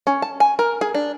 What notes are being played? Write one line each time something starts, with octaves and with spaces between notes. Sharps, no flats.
C#4
A5
G#5
A#4
G#4
D4